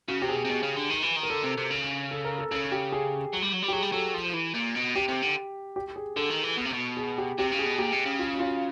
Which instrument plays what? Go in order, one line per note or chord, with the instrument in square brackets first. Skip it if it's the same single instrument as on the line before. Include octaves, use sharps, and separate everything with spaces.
[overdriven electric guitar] C#3 [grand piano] F#4
[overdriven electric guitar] C3 [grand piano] G4
[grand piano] G#4
[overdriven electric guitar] B2
C3
[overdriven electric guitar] B2 [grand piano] G#4
[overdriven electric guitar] C#3
D3
D#3
E3
D#3
[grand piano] A#4
[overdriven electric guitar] D3 [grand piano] A4
[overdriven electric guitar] C3
C3
C#3
[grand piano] A4
A#4
A4
[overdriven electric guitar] C#3 [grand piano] A4
[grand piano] G4
G#4
[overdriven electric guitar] F#3
G3
F#3
G3
[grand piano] G4
[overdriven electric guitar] F#3 [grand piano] G#4
[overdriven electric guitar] G3
[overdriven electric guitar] F#3 [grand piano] A4
[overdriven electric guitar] F3
E3
A#2
B2
[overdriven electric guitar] C3 [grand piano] G4
[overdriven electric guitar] C3
D3
[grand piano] G4
G#4
[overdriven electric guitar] D3 [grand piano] A4
[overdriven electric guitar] D#3
E3
B2
C3
B2
[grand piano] G#4
G4
[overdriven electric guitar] C3 [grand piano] G4
[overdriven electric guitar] C#3
[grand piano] G#4
[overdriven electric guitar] B2
[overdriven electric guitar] A#2 [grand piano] G4
[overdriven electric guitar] B2
C#3
[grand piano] F4
F#4
F4